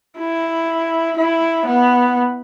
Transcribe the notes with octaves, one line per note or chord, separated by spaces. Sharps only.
E4
E4
B3